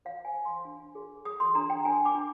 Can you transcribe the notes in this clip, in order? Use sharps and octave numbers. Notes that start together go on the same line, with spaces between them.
C5 F5
G#5
C5
C6
D4
G#4
G#4 D#6
C6
D4 A#5
G5
D4 G#5
D6
D4